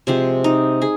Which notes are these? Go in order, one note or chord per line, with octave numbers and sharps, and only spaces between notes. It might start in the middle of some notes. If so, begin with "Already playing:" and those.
C3 F3 G#3 C4
D#4
G#4